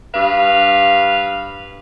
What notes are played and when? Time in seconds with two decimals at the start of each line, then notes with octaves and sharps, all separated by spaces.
0.13 G2 B4 F5